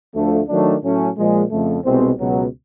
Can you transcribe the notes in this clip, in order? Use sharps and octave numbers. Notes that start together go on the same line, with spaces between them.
D2 D3 F3 A3
D#3 F#3 A3 D4
A2 F#3 A3 C#4
A#2 F3 G#3
F2 C#3 F3 A3
C2 B2 G#3 C4
C#2 B2 F#3